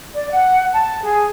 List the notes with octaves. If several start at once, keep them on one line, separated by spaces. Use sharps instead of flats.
D5
F#5
A5
G#4